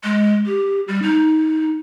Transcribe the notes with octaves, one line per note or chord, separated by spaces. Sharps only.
G#3
G4
G3
D#4